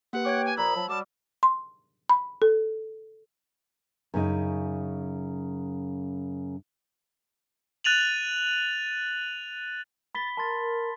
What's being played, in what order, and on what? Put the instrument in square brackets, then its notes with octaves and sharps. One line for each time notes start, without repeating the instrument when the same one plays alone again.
[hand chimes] A#3 G4 B4 [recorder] F#5
[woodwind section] C#5 G5 [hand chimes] D6 F#6 G#6
[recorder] G#5
[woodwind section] A#2 F3 [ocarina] A#5 [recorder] B5 [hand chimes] E6
[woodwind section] F3 F#3 [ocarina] A5
[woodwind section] F#3 G3 [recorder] A5 [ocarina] D6
[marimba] C6
B5
A4
[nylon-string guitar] F#2 C#3 D#4
[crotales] F#6 A6 D#7 F7 F#7
[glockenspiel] B5 B6 G7 [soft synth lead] A6
[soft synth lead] A#4 [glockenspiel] A5 C6 A6